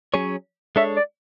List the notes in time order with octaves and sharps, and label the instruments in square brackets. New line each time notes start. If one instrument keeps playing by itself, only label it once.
[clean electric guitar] F#3 C#4 G#4 C#5
[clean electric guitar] G#3 D4 A4 C#5 [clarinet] E5
[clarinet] D5